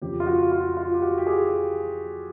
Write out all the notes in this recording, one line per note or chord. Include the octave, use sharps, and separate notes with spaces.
F2 C#3 F3 G4
F4
F#4
F4
F4
G4
F#4
G4
G#4